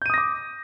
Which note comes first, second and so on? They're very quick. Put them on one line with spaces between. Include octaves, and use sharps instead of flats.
G6 D#7 D#6 A#6 D6